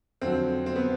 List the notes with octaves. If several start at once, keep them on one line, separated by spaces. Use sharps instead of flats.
F2 D3 F#3 C4
C4
B3